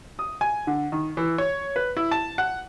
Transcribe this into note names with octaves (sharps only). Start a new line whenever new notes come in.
D#6
G#5
D3
D#3
E3
C#5
B4
E4
A5
F#5